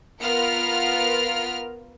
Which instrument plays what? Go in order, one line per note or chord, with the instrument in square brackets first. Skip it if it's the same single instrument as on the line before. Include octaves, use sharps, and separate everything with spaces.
[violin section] B3 F4 A#4 F6